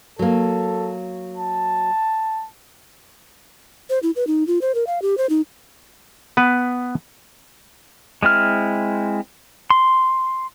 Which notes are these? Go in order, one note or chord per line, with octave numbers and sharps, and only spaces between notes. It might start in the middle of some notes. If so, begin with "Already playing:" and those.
F#3 A#3 A4
A5
C5
E4
B4
D#4
F4
C5
A#4
F5
G4
C5
D#4
B3 B4
G#3 C4 E4 F6
C6